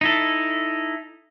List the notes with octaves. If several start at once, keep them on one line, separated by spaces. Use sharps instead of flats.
D#4 E4 A4